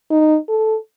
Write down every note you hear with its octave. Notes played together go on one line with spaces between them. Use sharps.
D#4
A4